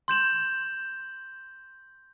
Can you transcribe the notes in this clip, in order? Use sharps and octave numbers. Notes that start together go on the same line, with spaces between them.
C6 G6 E7 F#7